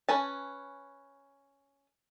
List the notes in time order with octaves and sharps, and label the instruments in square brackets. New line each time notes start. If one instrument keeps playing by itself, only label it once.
[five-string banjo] C#4 B4 G#5 A5